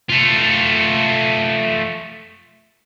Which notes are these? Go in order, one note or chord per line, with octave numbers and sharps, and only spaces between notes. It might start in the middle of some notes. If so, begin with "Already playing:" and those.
A3 F4